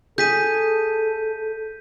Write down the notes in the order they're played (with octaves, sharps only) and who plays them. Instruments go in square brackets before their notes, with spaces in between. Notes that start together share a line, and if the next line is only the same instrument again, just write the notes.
[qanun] G#4 [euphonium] A4 [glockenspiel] G6 B6 D#7